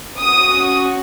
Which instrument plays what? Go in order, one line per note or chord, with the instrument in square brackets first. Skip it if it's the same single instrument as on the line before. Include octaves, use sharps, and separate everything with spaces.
[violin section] C#4 F#4 D#6